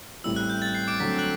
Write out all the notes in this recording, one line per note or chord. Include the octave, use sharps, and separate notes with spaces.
A1 A2 G3 C4 E4 E6
F#6
G6
A6
C7
D6 D7
D3 F#3 A3 C4 B6
F#6 F#7